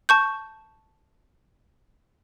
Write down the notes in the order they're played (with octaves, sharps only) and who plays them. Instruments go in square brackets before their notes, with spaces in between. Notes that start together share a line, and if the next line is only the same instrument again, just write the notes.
[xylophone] A5 C#6 G6